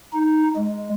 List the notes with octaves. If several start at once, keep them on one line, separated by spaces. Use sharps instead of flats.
D#4
G#3